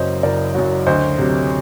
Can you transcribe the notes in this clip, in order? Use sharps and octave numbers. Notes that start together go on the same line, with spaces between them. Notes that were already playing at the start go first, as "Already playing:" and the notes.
Already playing: F#1 F#2 F#3 C5 D#5
F#1 A#4 D5
F#2 F#3
D2 C5 D#5
C3 F#3